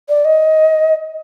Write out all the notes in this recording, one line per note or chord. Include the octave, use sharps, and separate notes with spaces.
D5
D#5